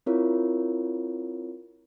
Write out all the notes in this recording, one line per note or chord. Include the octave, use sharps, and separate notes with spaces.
C4 E4 F4 A#4 C#5